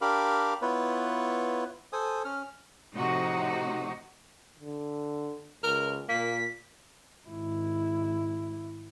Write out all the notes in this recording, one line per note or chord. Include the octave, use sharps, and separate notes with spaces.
D4 G4 A#4 F5 B5 D6
B3 E4 F4 B4 C#5
A4 C5 G#5 D#6
C#4 F6
A2 C3 F3 D#4 F#4
D3
C#2 A#4
A#2 A#3 B6
G#1 E4